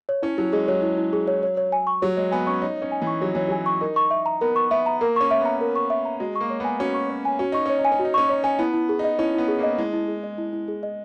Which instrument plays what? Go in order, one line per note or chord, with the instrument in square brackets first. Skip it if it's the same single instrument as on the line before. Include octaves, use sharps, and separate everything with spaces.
[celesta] C#5
[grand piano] C#4 [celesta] E4
[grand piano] F#3 [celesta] E4
[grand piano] G#3 [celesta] G#4
[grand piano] F#3 [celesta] C#5
[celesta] E4
E4
G#4
C#5
C#5
C#5
G#5
C#6
[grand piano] F#3 [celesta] C#5
[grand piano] G#3 [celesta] C#5
[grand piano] B3 [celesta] G#5
[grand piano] C#4 [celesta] C#6
[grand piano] D#4 [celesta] C#5
[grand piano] C#4 [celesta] C#5
[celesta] G#5
[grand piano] E3
[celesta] C#6
[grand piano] F#3 [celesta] C#5
[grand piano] E3 [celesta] C#5
[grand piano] F#3 [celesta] G#5
[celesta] C#6
[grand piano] D#4 [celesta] A#4
[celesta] C#6
E5
A#5
[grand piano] B3 [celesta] A#4
[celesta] C#6
[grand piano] B3 [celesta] E5
[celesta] A#5
[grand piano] A#3 [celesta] A#4
[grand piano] C#4 [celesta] C#6
[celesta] E5
[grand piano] B3 [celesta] A#5
[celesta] A#4
C#6
E5
A#5
[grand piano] G#3 [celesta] F#4
[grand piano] A#3 [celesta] C#6
[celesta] C#5
[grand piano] B3 [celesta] G#5
[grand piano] C#4 [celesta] F#4
[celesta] C#6
C#5
G#5
[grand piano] C#4 [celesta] F#4
[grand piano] D#4 [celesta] C#6
[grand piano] C#4 [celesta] C#5
[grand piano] D#4
[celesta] G#5
[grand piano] C#4
[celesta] F#4
[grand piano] D#4
[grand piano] C#4 [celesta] C#6
[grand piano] D#4 [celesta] C#5
[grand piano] C#4 [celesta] G#5
[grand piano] B3 [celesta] E4
[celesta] E4
G#4
[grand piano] D#4 [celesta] D#5
[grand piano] C#4 [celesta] E4
[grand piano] B3 [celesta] E4
[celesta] G#4
[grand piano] A#3 [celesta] D#5
[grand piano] G#3 [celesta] E4
[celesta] E4
G#4
D#5
E4
E4
G#4
D#5